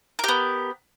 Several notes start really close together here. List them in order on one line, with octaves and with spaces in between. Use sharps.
A#4 G4 B3